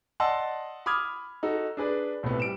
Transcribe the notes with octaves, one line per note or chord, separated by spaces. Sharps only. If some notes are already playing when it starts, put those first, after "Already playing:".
D5 D#5 F#5 A5 C6 E6
B5 D6 D#6 F6 G#6
D#4 F#4 A4
D4 G#4 B4 D5
B1 A2 C3 B3
G3 D7 E7